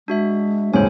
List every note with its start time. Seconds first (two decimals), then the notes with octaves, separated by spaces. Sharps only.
0.08 G#3 D4 F#4 E5
0.74 D#1 C#2 G#2 C5 C#5 G#5